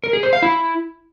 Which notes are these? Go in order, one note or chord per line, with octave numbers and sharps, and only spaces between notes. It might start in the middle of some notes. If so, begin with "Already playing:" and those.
A#4
G#4
C5
F5
E4